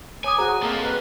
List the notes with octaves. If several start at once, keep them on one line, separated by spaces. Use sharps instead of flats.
C#5 G#5 D6 D#6
F#4 G#4 C5 A#5
A#3 C4 A4
B4